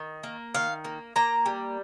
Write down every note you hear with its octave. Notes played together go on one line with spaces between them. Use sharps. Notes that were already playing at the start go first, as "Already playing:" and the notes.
Already playing: D#3
A#3
D#3 F5
A#3
A#3 A#5
G3